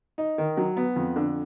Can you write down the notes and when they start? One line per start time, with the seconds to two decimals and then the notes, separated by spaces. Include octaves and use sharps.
0.18 D#4
0.38 D#3
0.57 F#3
0.77 B3
0.96 F2
1.16 D3